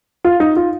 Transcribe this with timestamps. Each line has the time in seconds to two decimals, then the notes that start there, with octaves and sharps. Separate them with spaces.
0.24 F4
0.40 D#4
0.56 F4